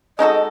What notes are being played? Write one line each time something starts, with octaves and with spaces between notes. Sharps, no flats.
G#3 D#4 F#4 A4 D#5